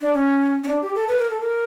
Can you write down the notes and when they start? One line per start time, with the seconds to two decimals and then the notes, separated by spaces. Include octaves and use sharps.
0.01 D4
0.14 C#4
0.64 C#4
0.68 D4
0.82 G4
0.95 A4
1.08 B4
1.19 A#4
1.30 A4
1.40 A#4